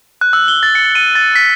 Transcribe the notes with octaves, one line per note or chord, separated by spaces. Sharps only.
F#6
E6
G7
A6
C#7
D#7
A6
B6